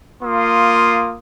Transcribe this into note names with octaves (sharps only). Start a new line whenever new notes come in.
A#3 F4 C6 D#6